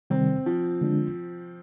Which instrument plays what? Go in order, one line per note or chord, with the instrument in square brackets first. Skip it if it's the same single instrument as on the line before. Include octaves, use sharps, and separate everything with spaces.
[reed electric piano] C3 D#3 G3 [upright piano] C4
[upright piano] F3
[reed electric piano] D3 G#3 D4